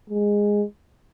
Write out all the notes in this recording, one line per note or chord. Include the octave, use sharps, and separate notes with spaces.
G#3